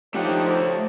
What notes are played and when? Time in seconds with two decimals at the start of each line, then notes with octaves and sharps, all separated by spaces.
0.14 F3 A3 D#4 G4 C5 C#5 F#5